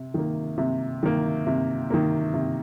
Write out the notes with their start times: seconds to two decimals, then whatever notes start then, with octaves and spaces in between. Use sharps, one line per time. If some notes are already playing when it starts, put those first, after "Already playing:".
Already playing: C3
0.14 D#3 A#3
0.58 C3
1.03 D#3 A#3
1.47 C3
1.90 D#3 A#3
2.34 C3